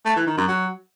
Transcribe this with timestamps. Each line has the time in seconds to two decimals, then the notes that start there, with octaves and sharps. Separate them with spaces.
0.06 A3
0.16 E3
0.27 D#3
0.37 F#2
0.48 F#3